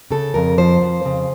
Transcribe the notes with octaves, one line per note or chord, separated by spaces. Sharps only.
C#3 A4
F2 A#4
F3 C5
F2
C#3